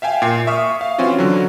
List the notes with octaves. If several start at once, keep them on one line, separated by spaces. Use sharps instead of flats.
E5 F5 G5 G#5
A#2 C7
E5 C#6 D#6 F6
F5
E3 C4 C#4 F4 F#4
D3 F#3